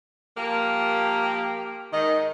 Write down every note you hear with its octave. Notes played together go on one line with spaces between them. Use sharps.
F3 A#3 G4
G#2 D#3 D#5